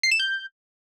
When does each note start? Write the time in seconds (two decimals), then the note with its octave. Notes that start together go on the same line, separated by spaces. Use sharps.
0.03 C7
0.11 E7
0.19 G6